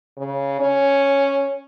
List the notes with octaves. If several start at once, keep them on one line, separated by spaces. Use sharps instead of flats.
C#3
C#4